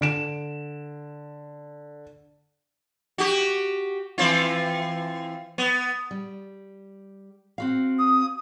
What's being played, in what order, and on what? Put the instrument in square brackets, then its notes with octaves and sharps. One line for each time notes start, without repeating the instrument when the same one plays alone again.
[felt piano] D3 D7 E7
[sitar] F#4 G4
E3 C4 F4
B3
[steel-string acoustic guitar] G3
C4 F#4 F5
[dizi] D#6